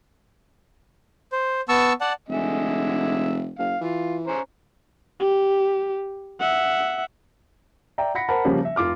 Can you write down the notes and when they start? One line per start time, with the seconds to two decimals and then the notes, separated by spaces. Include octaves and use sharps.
1.32 C5
1.69 B3 A5 C#6 E6
2.01 D5 F#5 A5
2.29 F1 D3 G#3 E5
3.59 F#1 F5
3.81 E3 F4
4.27 C#4 C5 A#5
5.20 G4
6.40 E5 F#5
7.98 D5 E5 G5 A#5
8.15 F#5 B5 A#6 B6 C#7
8.28 A#4 C5 F#5 A5 B5
8.45 C#3 F3 G3 A#3 C#4
8.65 E5
8.76 F1 F4 D6 F6